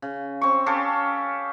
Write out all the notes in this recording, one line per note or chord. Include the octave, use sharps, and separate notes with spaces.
C#3
C4 C#6
C#4 G4 A4 F5